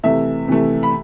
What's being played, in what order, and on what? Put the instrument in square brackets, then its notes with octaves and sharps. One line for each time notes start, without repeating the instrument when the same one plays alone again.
[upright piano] C3 E3 A3 E5
C3 E3 A3
B5